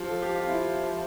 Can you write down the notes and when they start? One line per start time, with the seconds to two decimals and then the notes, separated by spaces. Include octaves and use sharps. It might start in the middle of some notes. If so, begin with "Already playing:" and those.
Already playing: F3 G4
0.10 A4
0.22 G4
0.35 F4
0.47 E4